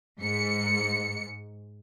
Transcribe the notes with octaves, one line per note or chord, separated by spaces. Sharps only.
G#2 C#7